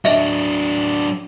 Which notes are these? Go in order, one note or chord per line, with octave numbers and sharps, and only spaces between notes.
F#3 D4 D#5 E5